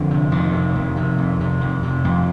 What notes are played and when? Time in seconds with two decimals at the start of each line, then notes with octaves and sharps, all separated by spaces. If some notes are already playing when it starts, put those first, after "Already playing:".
Already playing: F2 D3
0.10 C3
0.32 F2 D#3
0.53 C3
0.76 F2
0.96 C3
1.18 F2
1.40 C3
1.61 F2
1.83 C3
2.04 F2